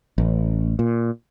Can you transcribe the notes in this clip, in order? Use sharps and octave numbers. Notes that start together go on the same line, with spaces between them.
A1
A#2